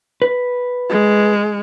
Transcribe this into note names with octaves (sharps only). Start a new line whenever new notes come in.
B4
G#3